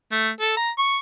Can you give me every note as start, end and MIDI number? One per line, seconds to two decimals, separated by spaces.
0.12 0.29 57
0.40 0.54 69
0.57 0.70 82
0.79 0.98 85